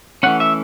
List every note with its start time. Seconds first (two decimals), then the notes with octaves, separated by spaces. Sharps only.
0.23 E3 A3 C#4 F#5
0.40 E5